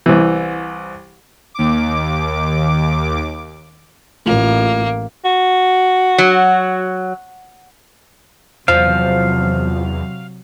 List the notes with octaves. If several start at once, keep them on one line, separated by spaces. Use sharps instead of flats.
C2 E3
D#2 D6
A1 A3 A#3 F4
F#4
F#3
E2 C3 F3 F#3 F5